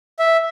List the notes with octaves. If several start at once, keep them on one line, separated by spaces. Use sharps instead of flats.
E5